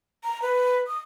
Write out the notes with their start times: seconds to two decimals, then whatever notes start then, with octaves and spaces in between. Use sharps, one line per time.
0.24 A#5
0.42 B4
0.87 D#6